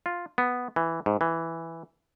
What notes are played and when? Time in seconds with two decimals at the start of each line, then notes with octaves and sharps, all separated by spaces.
0.06 F4
0.38 B3
0.76 E3
1.06 G#2
1.21 E3